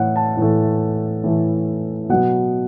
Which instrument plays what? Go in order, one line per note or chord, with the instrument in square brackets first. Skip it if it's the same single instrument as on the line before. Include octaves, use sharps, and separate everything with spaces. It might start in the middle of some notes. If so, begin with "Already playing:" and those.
Already playing: [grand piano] A2 E3 A3 F#5
A5
A2 E3 A3
A2 E3 A3
B2 F#3 B3 F#5